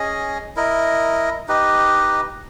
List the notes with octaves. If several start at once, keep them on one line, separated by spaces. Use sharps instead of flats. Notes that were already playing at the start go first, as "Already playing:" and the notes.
Already playing: C#4 G#4 D#5
E4 A#4 D#5
D#4 G4 B4 D#5